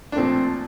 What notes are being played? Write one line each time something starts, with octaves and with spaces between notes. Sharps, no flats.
D4
A#2 F3 A3 C4